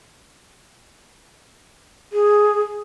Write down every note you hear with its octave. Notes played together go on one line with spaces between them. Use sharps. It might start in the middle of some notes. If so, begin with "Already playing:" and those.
G#4